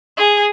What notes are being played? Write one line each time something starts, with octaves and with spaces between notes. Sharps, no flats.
G#4